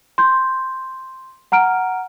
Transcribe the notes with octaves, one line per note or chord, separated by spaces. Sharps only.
C6 G6
F#5 A#5 F6 D7